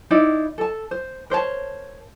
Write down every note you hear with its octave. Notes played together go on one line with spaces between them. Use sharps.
D#4 E4 D5 F5
A4 A5
C5
A#4 C5 C#5 A5